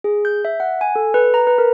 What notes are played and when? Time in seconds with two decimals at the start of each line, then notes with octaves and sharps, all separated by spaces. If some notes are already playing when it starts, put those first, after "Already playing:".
0.04 G#4
0.25 G6
0.45 E5
0.60 F#5
0.81 G#5
0.96 A4
1.14 B4
1.34 A#5
1.47 B4
1.58 A#4